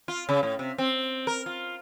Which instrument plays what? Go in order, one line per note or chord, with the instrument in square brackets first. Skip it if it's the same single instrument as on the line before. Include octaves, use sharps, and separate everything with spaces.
[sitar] F4
C#3
A2
C3
C4
A#4
F4